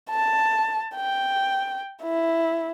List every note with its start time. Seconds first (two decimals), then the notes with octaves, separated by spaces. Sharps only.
0.11 A5
0.96 G5
2.03 E4